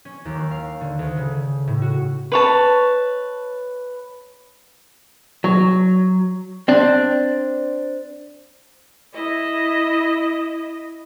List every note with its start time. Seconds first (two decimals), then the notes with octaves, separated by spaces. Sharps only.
0.05 C#4
0.25 D#2
0.51 F5
0.81 D3
0.99 D2
1.17 C#3
1.68 A2
1.82 F#4
2.32 B4 C#5 A5
5.44 F#3
6.68 C4 D4
9.14 E4 D#5